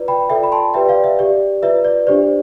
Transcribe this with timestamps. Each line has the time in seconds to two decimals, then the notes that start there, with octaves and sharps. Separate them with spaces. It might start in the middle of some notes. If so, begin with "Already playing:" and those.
Already playing: F4 B4 D5
0.08 G5 B5
0.30 F4 A4 D5 E5 G5
0.43 B5
0.52 A5 C6
0.74 G4 B4 D5 E5 G5
0.89 D5 F5
1.04 E5
1.19 G4 D5
1.62 F4 B4 D5 E5
1.85 D5
2.07 D4 G4 C5 D5